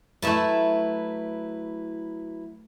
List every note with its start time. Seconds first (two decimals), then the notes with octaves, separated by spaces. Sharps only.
0.22 F#3 A3 E4 B4 E5 A5